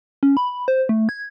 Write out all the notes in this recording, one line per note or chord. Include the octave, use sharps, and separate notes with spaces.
C#4
B5
C5
A3
G#6